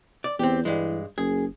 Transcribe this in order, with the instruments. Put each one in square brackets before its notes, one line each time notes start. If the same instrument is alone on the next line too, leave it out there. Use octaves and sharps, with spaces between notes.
[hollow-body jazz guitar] D5
[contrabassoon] E2 [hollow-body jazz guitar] C4 G4
[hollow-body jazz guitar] G2 G#3 [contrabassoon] E3
[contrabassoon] F#1 [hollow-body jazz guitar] G#4